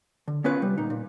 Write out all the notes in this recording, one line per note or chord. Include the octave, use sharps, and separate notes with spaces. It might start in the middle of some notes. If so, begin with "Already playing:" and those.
D3
B3 C#4 F4 B4
C2 G3
A#2 D#4
A#2